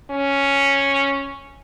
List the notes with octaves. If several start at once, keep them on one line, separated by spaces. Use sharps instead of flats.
C#4